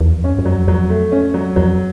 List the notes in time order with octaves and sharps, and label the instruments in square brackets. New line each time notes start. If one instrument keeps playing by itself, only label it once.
[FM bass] E2
F2
[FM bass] F#2 [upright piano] C#4
[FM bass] F#2
[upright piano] F#3
[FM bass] F2
[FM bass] F2 [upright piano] F#3
[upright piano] A3
C#4
F#3
[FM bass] F2 [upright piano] F#3